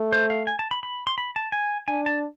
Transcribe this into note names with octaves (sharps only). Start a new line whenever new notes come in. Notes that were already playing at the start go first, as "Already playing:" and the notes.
Already playing: A3
C5
F5
G#5
A5
B5
B5
C6
B5
A5
G#5
D4 G#5
A5